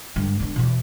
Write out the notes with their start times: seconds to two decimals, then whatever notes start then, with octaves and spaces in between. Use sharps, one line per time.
0.16 G2 D3
0.40 D3 B3
0.56 E2 B2